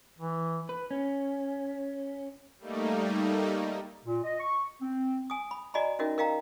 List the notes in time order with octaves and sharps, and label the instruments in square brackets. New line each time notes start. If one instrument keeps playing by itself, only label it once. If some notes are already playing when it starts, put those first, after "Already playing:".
[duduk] E3
[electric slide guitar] B4
C#4
[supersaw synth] G3 A3 A#3 D#4
[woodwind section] A#2
D#5
C#6
C4
[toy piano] G#5 D#6
B5
F#4 D5 D#5 G#5 A#5 B5
C#4 D#4 F#4 A#4 E5
A#4 D#5 F5 G5 A#5